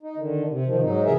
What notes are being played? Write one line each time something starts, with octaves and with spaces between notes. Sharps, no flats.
D#4
D3 D#3
C3
C3 D#3 F3
G#2 F#3 D#4
C3 E3 G#4 A#4 E5